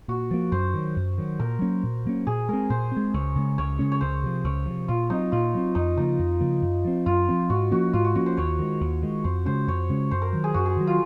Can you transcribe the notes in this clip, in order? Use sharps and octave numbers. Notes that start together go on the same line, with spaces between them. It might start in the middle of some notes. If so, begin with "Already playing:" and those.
A#2 F#4
F3 A#3
F#2 C5
D#3 F#3
F#2
D#3 F#3
A#2 A#4
F#3 A#3 C#4
A#2
F#3 A#3 C#4
A#2 G#4
G#3 C4 A#4
A#2 C5
C4
G#3
C#2 C#5
C#3 G#3 C#4
C#2 C#5
C#3 G#3 C#4
C#5
C#2 C5
C3 F3
C#2 C#5
C3 F3
A#2 F4
F#3 C4 D#4
A#2 F4
F#3 C4
F2 D#4
C#3 F3 A#3 D#4
F2
C#3 F3 A#3
F#2
F3 C4
F#2 F4
F3 C4
G#2 F#4
F3 A#3 C#4 F#4
G#2 F4
F#4
F3 A#3 C#4 F#4
C5
D#2 C#5
D#3 G#3
D#2
D#3 G#3
F2 C5
C#3 G#3 C#4 C5
F2 C#5
C#3 G#3 C#4
F#2 C5
A#4
D#3 F#3
G#4
F#2 F#4
G#4
D#3 F#3
F4